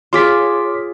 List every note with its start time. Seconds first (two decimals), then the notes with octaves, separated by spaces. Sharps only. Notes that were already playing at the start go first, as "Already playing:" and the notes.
0.13 F4 G#4 C#5 C6 D6 B6